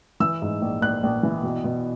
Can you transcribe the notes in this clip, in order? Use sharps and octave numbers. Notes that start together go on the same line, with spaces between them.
E3 E6
G#2
A#1
A#1 F#6
A#1
E3
B2
B2